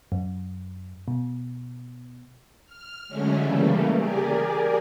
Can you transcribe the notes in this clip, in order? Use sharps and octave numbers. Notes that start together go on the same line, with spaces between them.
F#2
B2
F6
D3 F#3 G#3 A3 C#4
C#3 E3 G3 A3 A#3
G4 G#4 A#4 D5 G#5